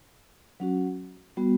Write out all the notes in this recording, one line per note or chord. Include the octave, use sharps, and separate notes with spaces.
F#3 C#4 F#4
G3 B3 F#4